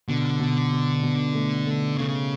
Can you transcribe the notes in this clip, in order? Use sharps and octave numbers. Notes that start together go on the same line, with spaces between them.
B2 D3
B2
B2
B2
A3
A3
C#3 A3